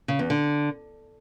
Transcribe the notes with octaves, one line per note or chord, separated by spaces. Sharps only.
C#3
E2
D3